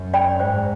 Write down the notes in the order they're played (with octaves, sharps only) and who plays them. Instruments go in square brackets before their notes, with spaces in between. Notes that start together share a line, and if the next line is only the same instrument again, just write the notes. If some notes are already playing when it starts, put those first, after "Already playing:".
Already playing: [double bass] F#2
[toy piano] D5 G5 B5
[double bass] G#2 [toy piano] C5